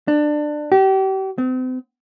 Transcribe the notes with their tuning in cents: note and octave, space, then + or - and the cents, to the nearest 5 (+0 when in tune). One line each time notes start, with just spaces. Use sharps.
D4 +20
G4 -35
C4 -40